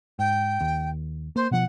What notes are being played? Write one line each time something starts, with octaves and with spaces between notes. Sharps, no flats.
G#2 G5
D#2
A#3 C5
B2 F3 F#5